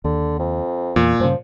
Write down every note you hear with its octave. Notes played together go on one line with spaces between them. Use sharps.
D#2 D3
F2
E2 A#2
G2 C#3 F3